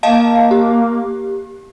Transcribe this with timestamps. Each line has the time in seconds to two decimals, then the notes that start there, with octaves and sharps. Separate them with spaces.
0.03 A#3 D#5 F5 A5
0.51 G4